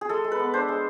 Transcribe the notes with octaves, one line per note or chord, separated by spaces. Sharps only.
G#4
G#3 A4
G#3
B4
B3
D4 C5
G#3